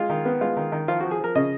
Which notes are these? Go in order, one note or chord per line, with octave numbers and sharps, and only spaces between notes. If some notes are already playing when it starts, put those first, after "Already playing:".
Already playing: G#3 F4
D#3
B3
G#3 F4
D#3
D#3
F3 F4
F#4
F3
G#4
F3 A#4
C#3 D#5